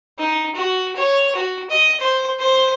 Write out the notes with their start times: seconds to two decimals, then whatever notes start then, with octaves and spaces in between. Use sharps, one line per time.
0.19 D#4
0.56 F#4
0.96 C#5
1.35 F#4
1.70 D#5
2.00 C5
2.39 C5